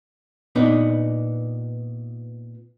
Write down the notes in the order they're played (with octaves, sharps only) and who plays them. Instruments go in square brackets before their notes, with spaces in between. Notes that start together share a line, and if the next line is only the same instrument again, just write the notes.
[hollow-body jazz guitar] A#2 B3 D4 D#4